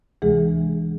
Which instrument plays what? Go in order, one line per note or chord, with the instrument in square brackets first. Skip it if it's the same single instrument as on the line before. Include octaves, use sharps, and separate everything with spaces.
[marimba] D2 C3 E3 G#3 G#4